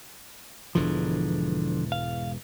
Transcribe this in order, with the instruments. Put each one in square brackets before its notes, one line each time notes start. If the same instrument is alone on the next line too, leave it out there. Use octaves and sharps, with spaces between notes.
[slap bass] E1 G#2 E3 [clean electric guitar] D3 F3
[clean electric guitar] F5